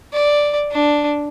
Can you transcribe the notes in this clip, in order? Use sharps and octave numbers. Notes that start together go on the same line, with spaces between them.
D5
D4